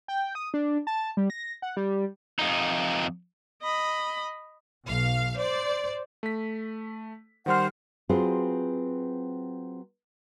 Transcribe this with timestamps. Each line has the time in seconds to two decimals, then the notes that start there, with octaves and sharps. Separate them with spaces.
0.08 G5
0.35 D#6
0.54 D4
0.87 A5
1.17 G3
1.30 A#6
1.62 F#5
1.77 G3
2.39 F2 D#4
3.62 D#5 B5
4.85 B1 F5
5.37 C5 D5
6.23 A3 B6
7.46 D#3 G3 C5 F#5 F6
8.09 F#3 C4 F4 G#4 B4 C5